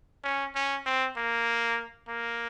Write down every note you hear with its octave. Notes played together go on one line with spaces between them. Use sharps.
C#4
C#4
C4
A#3
A#3